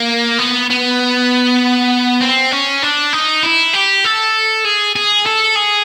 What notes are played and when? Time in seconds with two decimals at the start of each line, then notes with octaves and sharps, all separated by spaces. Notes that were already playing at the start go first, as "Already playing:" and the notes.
Already playing: A#3
0.39 B3
0.70 B3
2.21 C4
2.52 C#4
2.83 D4
3.13 D#4
3.43 E4
3.73 G4
4.05 A4
4.65 G#4
4.96 G#4
5.26 A4
5.56 G#4